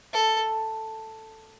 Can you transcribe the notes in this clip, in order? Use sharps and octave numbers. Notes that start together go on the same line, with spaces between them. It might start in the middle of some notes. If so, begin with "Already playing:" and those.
A4